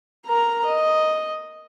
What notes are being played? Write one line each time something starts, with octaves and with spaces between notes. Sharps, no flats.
A#4 A#5
D#5